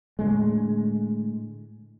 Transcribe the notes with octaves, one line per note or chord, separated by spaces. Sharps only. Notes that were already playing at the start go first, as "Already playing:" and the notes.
A2 D3 G#3